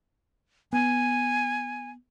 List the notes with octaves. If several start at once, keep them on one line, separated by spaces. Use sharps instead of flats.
B3 G#5